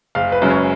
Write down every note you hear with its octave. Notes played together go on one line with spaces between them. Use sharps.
F#1 F5
B4
F#2 C#3 G#3
C#5